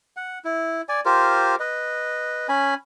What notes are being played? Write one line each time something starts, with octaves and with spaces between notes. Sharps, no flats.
F#5
E4
D5 G#5
F4 G4 A#4 C5
B4 D#5
C#4 G#5 B5